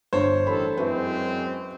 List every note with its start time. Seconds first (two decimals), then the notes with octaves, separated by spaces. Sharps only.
0.13 G1 G2 C5 C#5
0.47 A1 D#3 A4 B5
0.77 F#2 G#3 C4 E4 F#4 B4